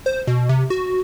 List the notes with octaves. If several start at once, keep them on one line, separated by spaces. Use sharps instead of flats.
C5
B2
C3
F#4